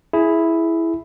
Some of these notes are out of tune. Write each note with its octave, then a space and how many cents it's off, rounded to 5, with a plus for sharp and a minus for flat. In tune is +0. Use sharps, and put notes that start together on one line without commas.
E4 +0 G#4 +10